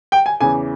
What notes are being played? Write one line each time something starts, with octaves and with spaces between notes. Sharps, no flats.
G5
G#5
E2 C#3 E3 G#5